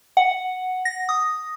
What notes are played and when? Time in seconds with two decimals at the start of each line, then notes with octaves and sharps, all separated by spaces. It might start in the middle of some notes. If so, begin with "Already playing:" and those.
0.17 F#5
0.85 A#6
1.09 D#6